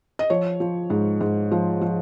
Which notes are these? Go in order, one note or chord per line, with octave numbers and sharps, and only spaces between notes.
D#5
F3 C#5
F3
G#2
G#2
F3
F3